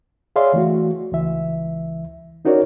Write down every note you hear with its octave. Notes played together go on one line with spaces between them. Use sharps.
G#4 C#5 D5 E5 F5 C6
E3 A3 F#4
C#2 E3 E5
C#4 D#4 F#4 A#4 C#5 D5